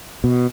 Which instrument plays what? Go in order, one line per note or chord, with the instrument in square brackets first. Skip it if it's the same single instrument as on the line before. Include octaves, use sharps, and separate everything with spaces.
[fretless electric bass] B2